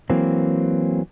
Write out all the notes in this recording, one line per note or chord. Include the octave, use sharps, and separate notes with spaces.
E3 F#3 A#3 C4